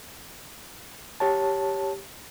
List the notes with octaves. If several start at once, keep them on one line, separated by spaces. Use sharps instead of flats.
G4 C#5 A5